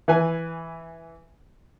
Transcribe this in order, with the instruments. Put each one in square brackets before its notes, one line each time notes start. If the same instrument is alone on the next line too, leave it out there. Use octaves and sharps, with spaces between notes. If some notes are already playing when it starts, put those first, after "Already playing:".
[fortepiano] E3 B4 G#5